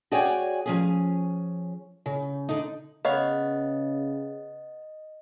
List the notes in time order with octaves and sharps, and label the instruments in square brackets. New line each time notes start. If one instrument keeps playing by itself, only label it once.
[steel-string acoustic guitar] F#4 G#4 C#5 D5 G5 G#5
F3 C#4 G#4
C#3
D3 D#4
[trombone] C#3 [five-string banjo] B3 C#5 F5 [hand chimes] D#5